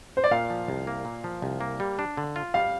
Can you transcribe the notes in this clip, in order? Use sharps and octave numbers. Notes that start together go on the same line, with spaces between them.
C5
D5
A#2 F5
F3
C2
A#3
A#2
F3
C2
A#3
G3
D4
D3
F4
G3 F5